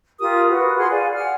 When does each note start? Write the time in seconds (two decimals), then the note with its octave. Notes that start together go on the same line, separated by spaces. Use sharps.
0.19 F4 G4 A#4 D#6
0.49 F#4 B4
0.78 G#4 F#5 C6 F6
0.90 D5 F5 G#5
1.14 F#5 F6